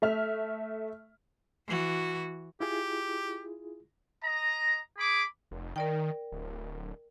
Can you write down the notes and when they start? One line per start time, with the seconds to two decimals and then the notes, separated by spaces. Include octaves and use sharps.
0.02 A3 E5 F6
1.67 E3 F#4
2.61 E4 F4 G4 G#4
4.24 D#5 A#5
4.98 G#4 B5 D6
5.51 F1
5.76 D#3 A#4 D5 G5
6.32 D1